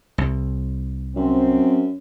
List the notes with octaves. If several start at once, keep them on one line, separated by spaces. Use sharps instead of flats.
C2
F#2 C4